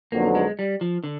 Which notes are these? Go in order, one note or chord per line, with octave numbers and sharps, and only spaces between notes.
F2 D3 F#3 A#3 B3 D#4
G#3
G3
F3
D3